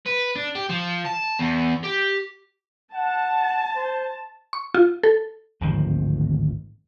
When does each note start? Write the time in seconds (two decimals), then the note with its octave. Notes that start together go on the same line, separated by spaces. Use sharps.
0.06 B4
0.36 D4
0.55 G4
0.69 F3
1.05 A5
1.39 E2
1.84 G4
2.94 F#5 A5
3.76 C5
4.53 C#6
4.74 F4
5.03 A4
5.61 D1 G#1 D#3 F3